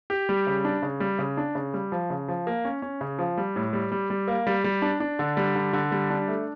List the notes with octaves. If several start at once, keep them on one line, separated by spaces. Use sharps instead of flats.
G4
G3
C#3
D4
C#3
G3
C#3
D4
C#3
G3
F3
C#3
F3
A#3
C#4
C#4
C#3
F3
G3
A2
G3
G3
G3
A#3
G3
G3
D4
D4
D3
G3
D3
D3
G3
D4
A3